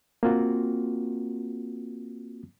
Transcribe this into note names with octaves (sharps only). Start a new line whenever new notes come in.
A#3 C4 F4 F#4